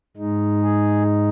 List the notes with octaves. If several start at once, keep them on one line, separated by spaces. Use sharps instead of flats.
G#2 G#3 D#4
G#4